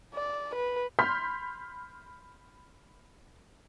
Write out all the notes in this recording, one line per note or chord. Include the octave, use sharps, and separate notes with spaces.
D5
B4
B5 C6 F6 G6 B6